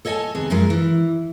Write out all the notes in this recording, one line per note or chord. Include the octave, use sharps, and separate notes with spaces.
A4 C#5 D#5 F5 G#5 A5
D#2 C3 B3 G#4
F#2 F3 G#3 A#3 A#4
E3